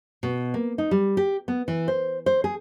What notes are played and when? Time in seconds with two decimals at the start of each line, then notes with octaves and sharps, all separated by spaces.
0.23 B2
0.54 A#3
0.78 D#4
0.91 G3
1.17 G4
1.48 B3
1.68 E3
1.88 C5
2.26 C5
2.44 G#4